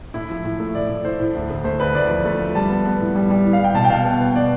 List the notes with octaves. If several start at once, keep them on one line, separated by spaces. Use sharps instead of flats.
A2 E4
F3
A2
A3
A2 D5
A2
A2 C5
A2
D2
D2
A3 C5
D2 B4
D2 D5
F3
A3
F3
G3 A5
B3
B3
A2
G3
G3
A2
F5
G3
G5
B2 A5
G5
B2 F5
B3
B3
B2 D5